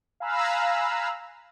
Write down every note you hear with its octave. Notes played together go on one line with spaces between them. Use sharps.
F5 G#5 A#5 B5 E6 F#6